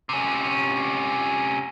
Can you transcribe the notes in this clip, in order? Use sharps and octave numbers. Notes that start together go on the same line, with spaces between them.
C3 C#4